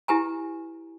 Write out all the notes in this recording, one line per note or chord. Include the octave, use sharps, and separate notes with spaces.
E4 G4 B4 G#5 A#5